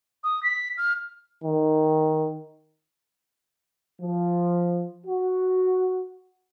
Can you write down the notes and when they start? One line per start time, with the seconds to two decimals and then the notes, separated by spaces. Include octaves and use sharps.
0.23 D#6
0.43 B6
0.77 F6
1.44 D#3
4.02 F3
5.06 F#4